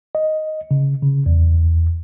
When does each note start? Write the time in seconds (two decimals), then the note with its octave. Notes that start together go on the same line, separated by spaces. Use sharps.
0.15 D#5
0.71 C#3
1.03 C#3
1.26 E2